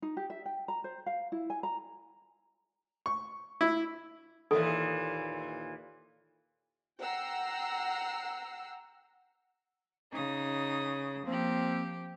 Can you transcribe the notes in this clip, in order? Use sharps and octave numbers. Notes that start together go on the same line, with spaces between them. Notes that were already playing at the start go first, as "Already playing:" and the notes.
D#4
G4
E5
G5
A#5
C5
F5
E4
G#5
A#5
C#6
E4
D#2 A#2 E3 A4
F#5 G5 A#5 E6 C7
C#3 D#4 D#6
F3 A#3 C4 G4